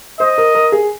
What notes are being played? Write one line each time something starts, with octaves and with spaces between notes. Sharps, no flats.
C5 D#5
A#4
A#4
G#4